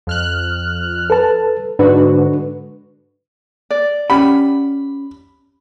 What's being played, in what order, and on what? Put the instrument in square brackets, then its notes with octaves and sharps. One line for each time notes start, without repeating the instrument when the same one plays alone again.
[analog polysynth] F2 F6 F#6
[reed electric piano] A4 B4 A5
[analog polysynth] G#2 D3 F#4 [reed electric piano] D4 B4
[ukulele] D5
[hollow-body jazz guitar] C#4 G4 F#5 [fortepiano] B5